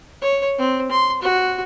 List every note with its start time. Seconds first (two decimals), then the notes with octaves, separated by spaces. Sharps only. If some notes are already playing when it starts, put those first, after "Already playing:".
0.22 C#5
0.58 C4
0.91 C6
1.22 F#4